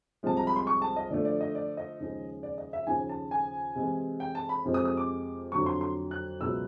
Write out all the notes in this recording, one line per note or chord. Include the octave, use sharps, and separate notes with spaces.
C2 C3 F3 G#3 A5
A#5
B5
C6
C#6
A5
D#5
D3 F3 A3 D5
D5
D#5
D5
D#5
D#2 C#3 F3 G#3
D5
D#5
E5
D#2 C#3 F3 G#5
A5
G#5
C3 E3 G#3
G5
A5
B5
F2 C3 F3 G#3
D#6
D#6
D6
F2 D3 F#3 C#6
C6
C6
F#6
C#2 B2 F#3 B3 E4 E6